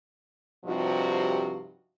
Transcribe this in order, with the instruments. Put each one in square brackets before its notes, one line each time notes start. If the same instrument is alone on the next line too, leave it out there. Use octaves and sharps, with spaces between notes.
[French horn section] G2 C3 F3 D#4 F#4